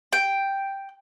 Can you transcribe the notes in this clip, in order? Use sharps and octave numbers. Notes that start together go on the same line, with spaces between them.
G5